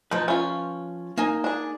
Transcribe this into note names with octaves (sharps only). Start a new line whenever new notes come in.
F3 D#4 B4
C#4 F4
A#3 D#4 G#5
D4 G#4